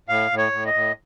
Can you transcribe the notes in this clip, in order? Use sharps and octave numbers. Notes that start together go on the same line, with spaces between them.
A2 F5
A2
C#5
A2
D#5
A2